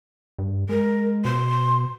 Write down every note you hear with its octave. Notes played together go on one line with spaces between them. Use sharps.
G2
G#3 A#4
B2 C6